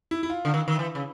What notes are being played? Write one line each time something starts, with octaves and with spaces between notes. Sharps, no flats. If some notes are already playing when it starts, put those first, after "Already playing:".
E4
E4
F4
D3
D#3
D#3
E3
C#3